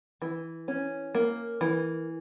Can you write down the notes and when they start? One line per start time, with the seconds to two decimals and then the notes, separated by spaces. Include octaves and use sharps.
0.22 E3
0.68 C#4
1.15 A#3
1.61 E3